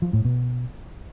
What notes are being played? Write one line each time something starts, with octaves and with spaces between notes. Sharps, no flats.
F3
A2
B2